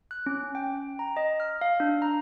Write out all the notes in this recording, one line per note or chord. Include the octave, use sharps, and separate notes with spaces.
F#6
C#4
G5
A#5
D#5
F6
F5
D4
A#5